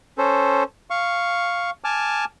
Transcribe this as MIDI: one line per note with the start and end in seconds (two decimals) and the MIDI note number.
0.18 0.63 61
0.18 0.63 69
0.18 0.63 72
0.90 1.70 77
0.90 1.70 85
1.84 2.25 80
1.84 2.25 81
1.84 2.25 86
1.84 2.25 89